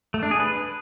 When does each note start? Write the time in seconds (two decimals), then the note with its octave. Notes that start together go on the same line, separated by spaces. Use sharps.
0.14 A3
0.23 D4
0.31 G#4
0.40 B4